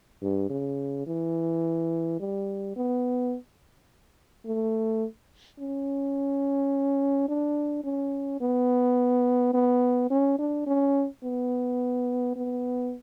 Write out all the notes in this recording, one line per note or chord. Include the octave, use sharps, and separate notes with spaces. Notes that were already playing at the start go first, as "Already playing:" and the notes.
G2
C#3
E3
G3
B3
A3
C#4
D4
C#4
B3
B3
C#4
D4
C#4
B3
B3